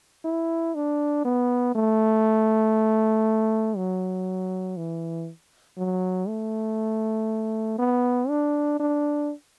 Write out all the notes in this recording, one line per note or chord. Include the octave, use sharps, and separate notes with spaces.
E4
D4
B3
A3
F#3
E3
F#3
A3
B3
D4
D4